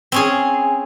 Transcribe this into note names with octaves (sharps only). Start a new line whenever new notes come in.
C4 C#4 G#4